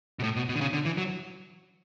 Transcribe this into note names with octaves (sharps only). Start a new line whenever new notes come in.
B2
A2
B2
B2
D3
C#3
D3
E3
F#3